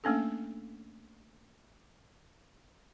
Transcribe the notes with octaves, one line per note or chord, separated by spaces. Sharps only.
A3 A#3 C#4 D4 A4